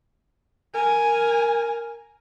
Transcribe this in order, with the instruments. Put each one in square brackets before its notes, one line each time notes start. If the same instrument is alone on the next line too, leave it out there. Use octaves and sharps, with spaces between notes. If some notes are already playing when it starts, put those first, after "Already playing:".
[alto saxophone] A#4 [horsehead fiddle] G#5